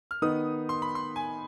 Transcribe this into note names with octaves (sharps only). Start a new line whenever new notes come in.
F6
D#3 B3 D#4 D#6
C6
B5
C6
G#5